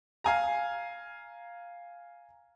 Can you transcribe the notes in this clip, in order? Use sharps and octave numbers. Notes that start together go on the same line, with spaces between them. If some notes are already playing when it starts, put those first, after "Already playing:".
F5 G#5 A#5